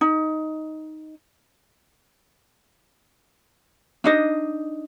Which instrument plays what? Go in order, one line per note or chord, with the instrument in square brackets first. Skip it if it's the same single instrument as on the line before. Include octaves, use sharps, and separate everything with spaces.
[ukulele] D#4
D4 D#4 D#5